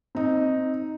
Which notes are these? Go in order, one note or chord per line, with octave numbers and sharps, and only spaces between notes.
C4 D#4